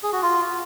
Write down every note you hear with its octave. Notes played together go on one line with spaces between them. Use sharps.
G#4
F#4
F4